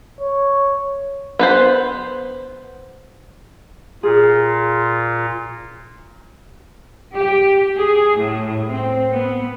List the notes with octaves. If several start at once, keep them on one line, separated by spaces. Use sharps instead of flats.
C#5
B3 B4 C5
A#2 F4 G#4
G4
G#4
A2
C4
B3